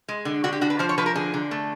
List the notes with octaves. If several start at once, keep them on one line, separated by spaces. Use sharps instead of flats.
G#3
D3
D3 F#4
G4
D3 F#4
B4
F3 C5
C#5
F3 B4
A#4
D3 G#4
D3
A3